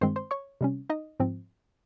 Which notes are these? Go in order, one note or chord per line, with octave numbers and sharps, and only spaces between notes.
G2 D#3 G#3 C4 C5 C6
C5 C6
C#5 C#6
C3 G3 C#4
D#4 D#5
G#2 F3 C4